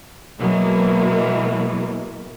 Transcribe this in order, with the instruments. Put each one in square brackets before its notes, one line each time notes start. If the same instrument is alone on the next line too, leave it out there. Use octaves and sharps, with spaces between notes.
[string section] B2 E3 F#3 G#3 A#3